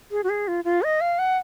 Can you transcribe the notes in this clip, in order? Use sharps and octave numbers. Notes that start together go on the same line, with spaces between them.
G#4
F#4
G#4
F4
F4
D#5
F5
F#5